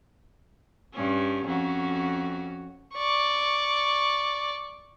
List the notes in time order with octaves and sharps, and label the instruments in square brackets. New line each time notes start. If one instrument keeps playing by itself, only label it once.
[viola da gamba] G2 C#4
F2 C#4 F#4
[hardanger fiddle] D5 C#6